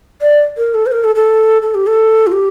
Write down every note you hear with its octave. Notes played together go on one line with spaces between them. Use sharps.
D5
A#4
A4
C5
A#4
A4
A4
A4
G4
A4
F4
G4